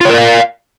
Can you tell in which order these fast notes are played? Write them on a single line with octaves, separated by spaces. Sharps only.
F4 C#5 A#4 D5 F5